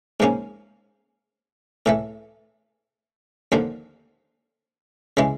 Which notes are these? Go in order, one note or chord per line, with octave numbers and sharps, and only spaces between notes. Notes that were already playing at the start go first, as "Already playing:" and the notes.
G#2 F3 A#3 C#4
A2 E3 A3
D#2 D3 F3
C#3 E3 G#3